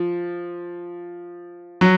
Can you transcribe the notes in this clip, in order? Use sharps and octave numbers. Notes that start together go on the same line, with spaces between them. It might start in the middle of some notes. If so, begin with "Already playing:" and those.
Already playing: F3
F#3